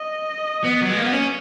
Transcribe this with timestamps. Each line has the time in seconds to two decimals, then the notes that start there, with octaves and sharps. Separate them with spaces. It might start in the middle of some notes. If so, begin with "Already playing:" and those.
Already playing: D#5
0.65 B3
0.82 F#3
0.90 G#3
0.97 A#3
1.05 B3
1.12 C#4